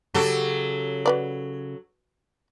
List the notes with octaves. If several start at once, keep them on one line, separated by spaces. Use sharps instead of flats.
C#3 F#3 G4 A4
F#4 B4 D5